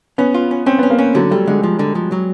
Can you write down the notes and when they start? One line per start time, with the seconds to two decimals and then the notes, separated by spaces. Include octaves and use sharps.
0.18 B3 C#4
0.34 F4
0.51 C#4
0.66 C4 C#4
0.79 B3
0.83 C#4
0.90 A#3
0.98 C#4
1.15 D3 F#3
1.31 G3 A3
1.47 D3 G#3
1.63 F3
1.79 D3
1.95 F3
2.12 F#3